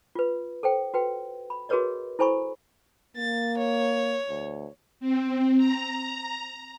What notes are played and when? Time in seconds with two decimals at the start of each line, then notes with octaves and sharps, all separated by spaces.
0.15 F4 B4
0.63 A4 C5 G5
0.94 F#4 B4 G5
1.50 B5
1.69 F#4 G#4 A#4 B4 C#5 D#5
2.19 E4 A4 C5 G#5 B5 C#6
3.17 A#3 A6
3.58 C#5
4.29 D2
5.00 C4
5.57 A#5